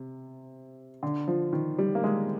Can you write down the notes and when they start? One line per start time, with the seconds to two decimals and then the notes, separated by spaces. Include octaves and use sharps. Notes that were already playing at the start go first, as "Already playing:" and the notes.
Already playing: C3
1.03 D3
1.28 F3
1.53 D#3
1.79 G3
1.95 A#3
2.04 G#3